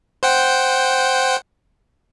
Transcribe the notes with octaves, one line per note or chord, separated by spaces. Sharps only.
C5 F#5 G5